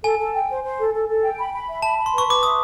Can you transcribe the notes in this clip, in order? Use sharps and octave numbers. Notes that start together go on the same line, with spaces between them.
A4 G#5
A4
G5
C5
C5
A4
A4
A4
G5
B5
B5
E5
A5 B5
B5
C6
B4
C#6
B4 D6
E5 D#6